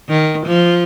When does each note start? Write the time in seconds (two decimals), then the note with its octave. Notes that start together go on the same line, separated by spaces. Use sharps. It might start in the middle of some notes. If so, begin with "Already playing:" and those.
0.09 D#3
0.46 F3